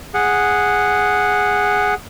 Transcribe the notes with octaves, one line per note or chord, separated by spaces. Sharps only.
G#4 F#5